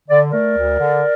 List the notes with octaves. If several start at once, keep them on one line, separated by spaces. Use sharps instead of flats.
D3 D5
A3 A#4 D5
D2
D3